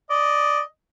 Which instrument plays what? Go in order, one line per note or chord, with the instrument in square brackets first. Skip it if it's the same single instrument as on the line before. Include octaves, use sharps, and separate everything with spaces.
[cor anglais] D5 [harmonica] D#5